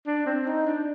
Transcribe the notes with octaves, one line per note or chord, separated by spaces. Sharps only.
D4
C4
D#4
D4